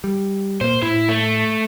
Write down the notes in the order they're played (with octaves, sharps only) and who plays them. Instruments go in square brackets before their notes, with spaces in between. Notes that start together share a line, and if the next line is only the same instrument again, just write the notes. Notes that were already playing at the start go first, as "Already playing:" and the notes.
[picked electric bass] G3
[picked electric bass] A#2 A#3 [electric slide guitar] C5
[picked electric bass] A2 [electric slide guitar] E4
[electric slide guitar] A3